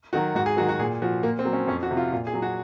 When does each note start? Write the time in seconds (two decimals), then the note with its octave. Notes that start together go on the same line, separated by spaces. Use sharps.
0.13 D#3 F#3 F#4
0.35 G#2 F#4
0.46 G#4
0.57 D#3 F#3 F#4
0.69 F#4
0.79 A#2 G#4
1.02 F3 F#4
1.23 A#2 A#3
1.39 C4
1.45 F#3
1.53 C#4
1.67 F2 C#4
1.82 F#4
1.90 C3 F3
1.97 F4
2.12 A#2 F4
2.27 G#4
2.34 F#3
2.42 F#4